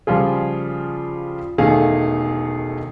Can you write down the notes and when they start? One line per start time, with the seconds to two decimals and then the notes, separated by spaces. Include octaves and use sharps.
0.07 C#3 F3 G3 F4 G#4
1.58 E1 D#3 A3 G#4 F5